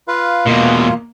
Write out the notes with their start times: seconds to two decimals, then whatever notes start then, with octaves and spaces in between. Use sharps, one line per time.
0.08 F4 B4 F5
0.46 E2 B2 A#3 F4